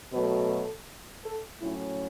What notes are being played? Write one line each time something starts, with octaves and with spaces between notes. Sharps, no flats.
B2 F#3 A3 B4
A4
A4
A2 F#3 C#4 E4